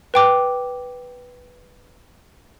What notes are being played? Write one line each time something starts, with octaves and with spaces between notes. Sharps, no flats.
B4 G5 D6